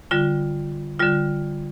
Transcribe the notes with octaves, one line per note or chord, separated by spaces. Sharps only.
D3 G3 F4
D3 G3 F4